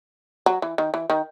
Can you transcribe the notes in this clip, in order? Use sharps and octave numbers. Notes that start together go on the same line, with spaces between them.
F#3
E3
D#3
E3
D#3